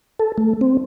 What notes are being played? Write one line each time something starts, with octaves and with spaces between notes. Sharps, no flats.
A4
A3
C4